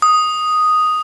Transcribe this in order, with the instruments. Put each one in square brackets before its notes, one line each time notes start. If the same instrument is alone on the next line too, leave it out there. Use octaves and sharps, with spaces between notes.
[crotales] D#6